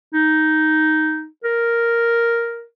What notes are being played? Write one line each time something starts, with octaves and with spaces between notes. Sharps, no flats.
D#4
A#4